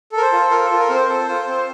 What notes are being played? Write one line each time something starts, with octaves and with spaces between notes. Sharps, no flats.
A4
A#4
C5
F4
F4 A#4
A4
F4
A#4
C4 C5
A4
F4
C4